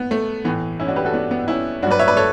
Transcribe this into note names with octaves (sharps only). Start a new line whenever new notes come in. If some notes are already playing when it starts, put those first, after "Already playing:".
Already playing: B3
A3
A2 E3 B3
C#4 E4
D4 F#4
G4 B4
F#4 A4
B3 D4
B3 D4
C#4 E4
G2 F#3 D4 F#4 B4 D5
C#5 E5
B4 D5
A4 C#5